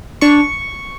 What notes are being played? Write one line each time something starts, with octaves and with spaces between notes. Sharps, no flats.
D4 C#6